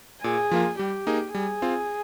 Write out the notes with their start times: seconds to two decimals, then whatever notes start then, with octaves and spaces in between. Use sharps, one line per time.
0.23 A#2 G#4
0.51 F3 A#3 F4
0.79 G3 G4
1.07 A#3 D#4 G#4
1.34 G3 G#4
1.62 C4 F4